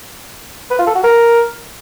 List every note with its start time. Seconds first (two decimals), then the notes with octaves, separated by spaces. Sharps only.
0.70 B4
0.79 F4
0.87 A4
0.95 F#4
1.03 A#4